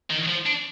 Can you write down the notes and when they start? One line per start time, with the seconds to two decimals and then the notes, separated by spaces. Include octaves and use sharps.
0.10 D#3
0.28 F3
0.46 D4